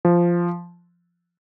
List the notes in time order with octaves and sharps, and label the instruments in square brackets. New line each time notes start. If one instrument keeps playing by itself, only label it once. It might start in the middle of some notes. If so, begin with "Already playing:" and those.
[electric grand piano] F3